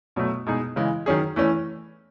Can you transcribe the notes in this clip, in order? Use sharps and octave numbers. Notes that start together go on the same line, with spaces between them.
B2 F#3 A3
B2 G#3 D#4 G#4
C#3 E3 G#3
D#3 F#3 C#4 G#4
E3 A3 C#4